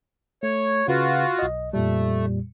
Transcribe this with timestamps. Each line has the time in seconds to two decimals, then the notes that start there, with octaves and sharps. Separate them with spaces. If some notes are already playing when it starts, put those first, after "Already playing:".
0.43 A3 C#5
0.88 C#3 F4 F#4 B4
1.39 B1 D#5
1.73 F2 A#2 G3 A3